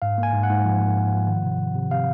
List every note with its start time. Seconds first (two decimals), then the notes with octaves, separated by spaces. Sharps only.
0.02 G#2 F5
0.18 A#3
0.23 G#5
0.34 G#2
0.43 F#5
0.49 G#2
0.65 F3
0.80 A#3
0.96 G#2
1.12 F3
1.27 D#3
1.43 C3
1.59 C3
1.75 C3
1.91 C3 F5